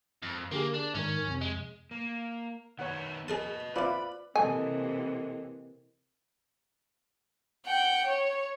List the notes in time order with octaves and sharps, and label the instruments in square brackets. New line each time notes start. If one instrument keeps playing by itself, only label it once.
[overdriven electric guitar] F2
[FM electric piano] D3 G4 G#4 [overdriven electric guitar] A#3
[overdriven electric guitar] D4
[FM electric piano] G#2 D#3 A#4 [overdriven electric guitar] C#4
[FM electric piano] F2 C3
[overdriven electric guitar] G#3
A#3
[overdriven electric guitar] D#3 B3 [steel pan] C#5 F#5
[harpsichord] G#4 A#4 A5 [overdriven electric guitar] B4 D#5
[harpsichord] C4 E4 [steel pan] F4 B4 D5 [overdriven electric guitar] B5
[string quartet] C3 E3 A#3 [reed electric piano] A4 D#5 [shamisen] G#5
[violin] F#5 G5
C#5